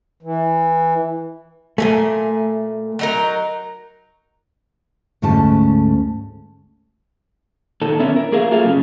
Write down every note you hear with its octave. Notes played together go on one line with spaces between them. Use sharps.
E3
A#2 A3 A#3 G#5
F#3 D#4 A#4
D2 G#2 A3 C#4 A5
A#2 D#3 A4
D3 B3 C#4 E4 A#4 E5
A#4
A#3 G#4 A#4 E5 F5
F#3 A#3 F4 G#4 A4 F5
F#2 C#3